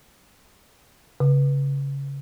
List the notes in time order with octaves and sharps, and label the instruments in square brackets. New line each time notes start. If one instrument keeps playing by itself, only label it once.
[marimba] C#3